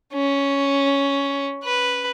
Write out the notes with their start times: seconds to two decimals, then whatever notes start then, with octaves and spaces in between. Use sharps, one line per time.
0.14 C#4
1.63 B4